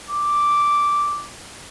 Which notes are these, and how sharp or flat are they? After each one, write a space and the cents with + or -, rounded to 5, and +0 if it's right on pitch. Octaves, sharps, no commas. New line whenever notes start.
D6 -5